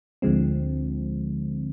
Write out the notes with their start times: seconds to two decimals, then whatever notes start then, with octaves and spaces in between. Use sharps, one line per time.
0.22 D2 D3 F3 G#3 C4